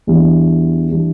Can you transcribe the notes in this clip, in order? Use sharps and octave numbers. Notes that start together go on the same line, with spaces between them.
E2 E3 G3 B3 D4
E3 G3 D4